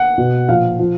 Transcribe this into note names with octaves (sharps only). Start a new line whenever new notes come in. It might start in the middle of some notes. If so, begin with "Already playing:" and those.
Already playing: F#5
B2
A#2 F3 F5
F3